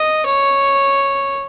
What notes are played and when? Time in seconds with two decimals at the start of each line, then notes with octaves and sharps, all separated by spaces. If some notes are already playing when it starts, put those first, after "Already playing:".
Already playing: D#5
0.26 C#5